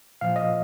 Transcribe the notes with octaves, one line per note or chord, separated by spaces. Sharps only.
A#2 F3 F5
D#5